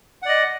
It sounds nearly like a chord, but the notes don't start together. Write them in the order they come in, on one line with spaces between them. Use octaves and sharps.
F#5 D5 D#5